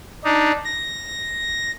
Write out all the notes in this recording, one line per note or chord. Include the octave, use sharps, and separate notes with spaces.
D4 D#4
A#6